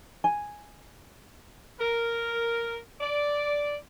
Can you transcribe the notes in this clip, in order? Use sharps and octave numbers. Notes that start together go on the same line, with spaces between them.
G#5
A#4
D5